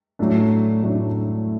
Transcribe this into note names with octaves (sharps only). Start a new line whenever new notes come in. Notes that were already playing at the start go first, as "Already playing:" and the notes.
A2 F#3 A3 D4
A2 F#3 A3 D4